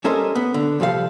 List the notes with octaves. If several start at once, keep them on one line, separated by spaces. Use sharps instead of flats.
G3 C#4 A4 A#4 C5 D#5
B3
D3
C2 F3 G3 A4 F5